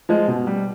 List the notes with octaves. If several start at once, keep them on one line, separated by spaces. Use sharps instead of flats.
F3 G#3
B2
G3